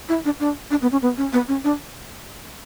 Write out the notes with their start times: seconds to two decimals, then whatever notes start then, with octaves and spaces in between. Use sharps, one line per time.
0.09 E4
0.25 D4
0.40 D4
0.70 D4
0.82 B3
0.92 C#4
1.02 B3
1.17 C#4
1.33 B3
1.48 C#4
1.64 D4